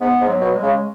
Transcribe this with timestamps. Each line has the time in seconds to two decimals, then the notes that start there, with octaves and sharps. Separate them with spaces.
0.01 G#2 B3
0.21 G#2
0.28 F#3
0.41 B2
0.55 G#3
0.63 C#3